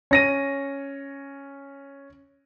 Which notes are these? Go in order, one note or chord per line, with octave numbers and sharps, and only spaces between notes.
C#4 A#6 D#7